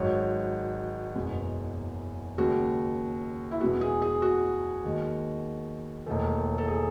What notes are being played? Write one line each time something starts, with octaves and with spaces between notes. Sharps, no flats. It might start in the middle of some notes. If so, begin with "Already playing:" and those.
Already playing: G#1 G#2 F#3 C#5
F#1 E2 B2 G#3
D#2 C#3 G#3 F#4
E4
E2 B2 G#3 F#4
G#4
G#4
F#4
D#2 D#3 G#3
E1 D#2 D#3 A3
A4
G#4